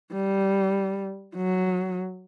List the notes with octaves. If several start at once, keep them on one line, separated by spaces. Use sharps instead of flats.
G3
F#3